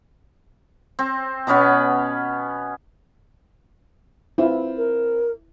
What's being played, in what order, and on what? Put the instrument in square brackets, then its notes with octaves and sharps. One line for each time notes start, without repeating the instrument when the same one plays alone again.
[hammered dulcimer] C4
B2 B3 C#4 B5
[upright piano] C4 F4 B4 [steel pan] E4
[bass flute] A#4